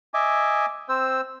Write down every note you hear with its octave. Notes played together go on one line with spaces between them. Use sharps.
D#5 E5 G#5 D6
C4 C5 E6